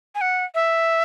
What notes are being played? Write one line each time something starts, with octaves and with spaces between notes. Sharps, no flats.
G#5
F#5
E5